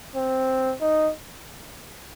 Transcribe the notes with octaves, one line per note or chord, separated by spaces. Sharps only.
C4
D#4